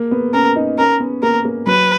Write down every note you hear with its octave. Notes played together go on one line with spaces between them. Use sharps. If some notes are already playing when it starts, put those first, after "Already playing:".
Already playing: A#3
B3
C#4 A#4
D#4
C#4 A#4
B3
A#3 A#4
A#3
F#3 B4